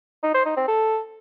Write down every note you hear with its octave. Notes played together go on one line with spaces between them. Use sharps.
D#4
C5
D#4
C4
A4